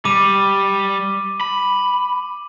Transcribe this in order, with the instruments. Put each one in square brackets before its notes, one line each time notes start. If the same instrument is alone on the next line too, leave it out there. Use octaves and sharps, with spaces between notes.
[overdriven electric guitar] G3 [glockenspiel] D6 D#7
[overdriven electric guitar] B5